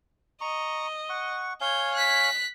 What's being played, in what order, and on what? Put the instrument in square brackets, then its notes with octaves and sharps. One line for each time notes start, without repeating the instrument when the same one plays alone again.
[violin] D#5 [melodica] A#5 C#6
[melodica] F#5 C#6
[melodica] C#5 F5 G#5 [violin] G6
[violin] F#6 B6